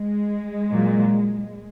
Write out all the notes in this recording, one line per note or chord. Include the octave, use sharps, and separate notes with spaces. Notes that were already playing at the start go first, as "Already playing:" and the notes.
Already playing: G#3
A#2 F#3